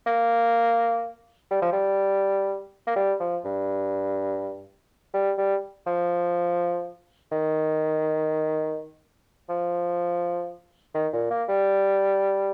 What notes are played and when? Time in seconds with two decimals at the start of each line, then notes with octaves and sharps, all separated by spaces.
0.06 A#3
1.51 G3
1.62 F3
1.73 G3
2.87 A#3
2.96 G3
3.20 F3
3.45 G2
5.14 G3
5.38 G3
5.87 F3
7.32 D#3
9.49 F3
10.95 D#3
11.13 A#2
11.31 A#3
11.49 G3